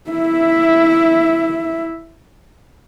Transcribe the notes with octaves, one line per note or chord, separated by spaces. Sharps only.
E4 E5